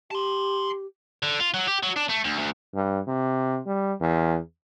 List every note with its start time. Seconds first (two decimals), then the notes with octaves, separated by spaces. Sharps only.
0.11 G4 A5 C6
1.23 D3
1.40 F4
1.54 F#3
1.68 G4
1.83 F#3
1.97 D4
2.10 A3
2.25 D2
2.39 D2
2.74 G2
3.08 C3
3.67 G3
4.00 E2